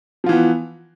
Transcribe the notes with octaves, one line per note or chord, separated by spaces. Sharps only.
E3 F3 B3 F4